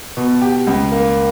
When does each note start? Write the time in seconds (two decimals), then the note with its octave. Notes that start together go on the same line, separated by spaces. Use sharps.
0.17 B2
0.42 G4
0.67 C#2
0.92 A#3